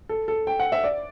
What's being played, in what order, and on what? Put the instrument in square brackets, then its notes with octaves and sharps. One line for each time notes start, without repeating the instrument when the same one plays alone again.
[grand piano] A4
A4
G5
F#5
E5
D5